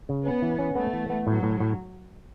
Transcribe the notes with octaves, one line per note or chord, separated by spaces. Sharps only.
C#3
B3 C#4
E3
C#4
A3 B3
E3
B3
A2 F#3
A2
A2